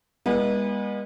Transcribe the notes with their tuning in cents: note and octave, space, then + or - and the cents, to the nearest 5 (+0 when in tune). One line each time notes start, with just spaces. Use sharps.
G#3 -40 B3 -35 E4 -15